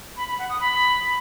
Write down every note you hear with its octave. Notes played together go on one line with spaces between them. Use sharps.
B5
B5
F#5
D#6
B5